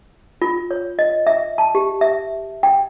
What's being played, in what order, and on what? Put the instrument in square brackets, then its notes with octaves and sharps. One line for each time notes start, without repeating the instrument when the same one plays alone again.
[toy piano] F4
C#5
D#5
E5
A5
G4
E5
G5